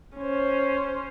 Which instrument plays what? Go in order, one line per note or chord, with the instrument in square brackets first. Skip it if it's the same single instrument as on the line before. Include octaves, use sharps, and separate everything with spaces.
[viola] C#4 C5